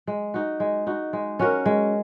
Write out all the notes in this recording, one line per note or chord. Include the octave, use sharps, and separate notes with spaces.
G#3
D#4 F#4
G#3
D#4 F#4
G#3
C#4 F#4 A#4
G#3